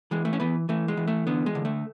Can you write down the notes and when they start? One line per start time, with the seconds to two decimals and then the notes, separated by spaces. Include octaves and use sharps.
0.11 E3 G#3
0.25 A3
0.33 C#4
0.40 E3 B3
0.69 E3 A3
0.88 G#3
0.97 E3
1.08 A3
1.27 D3 B3
1.46 G#3
1.55 D3
1.65 A3